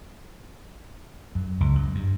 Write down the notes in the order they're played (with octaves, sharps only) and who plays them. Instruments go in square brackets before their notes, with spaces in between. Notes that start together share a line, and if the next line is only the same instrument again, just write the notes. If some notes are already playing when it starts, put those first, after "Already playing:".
[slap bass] F#2
C#2
F#2
G2